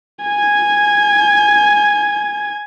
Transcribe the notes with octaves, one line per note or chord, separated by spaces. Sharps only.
G#5 G#6